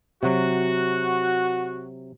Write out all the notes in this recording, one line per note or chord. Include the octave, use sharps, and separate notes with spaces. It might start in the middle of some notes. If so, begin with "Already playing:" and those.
C3 F#3 F#4